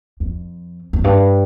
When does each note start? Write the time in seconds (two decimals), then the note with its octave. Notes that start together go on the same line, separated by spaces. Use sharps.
0.20 F2
0.93 F2
1.04 G2